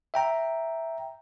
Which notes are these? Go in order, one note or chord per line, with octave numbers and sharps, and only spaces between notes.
E5 G5 A#5